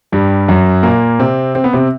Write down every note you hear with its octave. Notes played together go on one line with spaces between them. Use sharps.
G2 G3
F#2 F#3
A#2 A#3
C3 C4
C4
B3
C3 C4